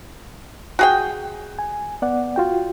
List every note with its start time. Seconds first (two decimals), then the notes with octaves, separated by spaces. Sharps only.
0.79 F#4 G#4 G5
1.59 G#5
2.02 B3 D5 F#5
2.36 F4 F#4 G5